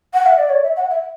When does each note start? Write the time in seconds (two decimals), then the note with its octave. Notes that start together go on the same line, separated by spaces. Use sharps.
0.14 F#5
0.26 E5
0.38 D5
0.50 C#5
0.63 E5
0.77 F#5
0.90 E5